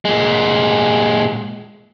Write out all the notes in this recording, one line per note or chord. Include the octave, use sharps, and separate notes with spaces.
A#2 G#3